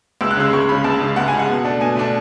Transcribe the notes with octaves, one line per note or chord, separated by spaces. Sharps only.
C#2 E6
F#6
C#3 G#3 E6
C#2 C#6
C#3 G#3 B5
C#2 A5
C#3 G#3
C#2 F#5
G#5
C#3 G#3
F#5
B2
A3 D4
B2 G#5
A3 D4